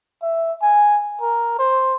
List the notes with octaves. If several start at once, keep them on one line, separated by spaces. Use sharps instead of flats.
E5
G#5
A#4
C5